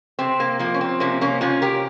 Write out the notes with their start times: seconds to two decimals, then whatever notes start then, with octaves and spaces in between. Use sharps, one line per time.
0.19 C3 C4
0.40 A#3
0.59 F3 A#3
0.74 C#4
0.81 C4
1.00 C3 A#3 C#4
1.21 A#3 C#4
1.41 C3 C#4 F4
1.62 G4 A#4